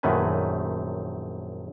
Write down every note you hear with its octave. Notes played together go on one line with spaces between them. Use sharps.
A#1 F#2 D#3 A3 B4 G#5